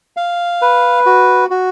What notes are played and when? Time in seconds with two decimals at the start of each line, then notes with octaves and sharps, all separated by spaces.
0.17 F5
0.62 B4
1.06 F#4
1.50 F#4